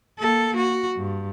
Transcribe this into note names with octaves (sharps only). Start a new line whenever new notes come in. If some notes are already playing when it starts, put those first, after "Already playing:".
A#3 A4
F#4
G2